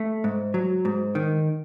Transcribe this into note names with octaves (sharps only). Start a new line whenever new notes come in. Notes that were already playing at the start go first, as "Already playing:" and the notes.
Already playing: A3
G#2
F#3
G#2
D#3